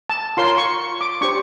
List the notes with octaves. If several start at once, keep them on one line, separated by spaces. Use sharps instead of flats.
A5
F4 A#4 C#5 C6
C#6
D6
D4 G4 C5 C#6